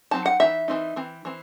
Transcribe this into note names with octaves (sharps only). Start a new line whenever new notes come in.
F#3 C4 D#4 A5
F#5
E3 C4 D#4 E5
E3 C4 D#4
E3 C4
E3 C4